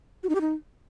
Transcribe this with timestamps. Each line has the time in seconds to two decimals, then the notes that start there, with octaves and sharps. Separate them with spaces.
0.23 F#4
0.29 D#4
0.35 G4
0.41 D#4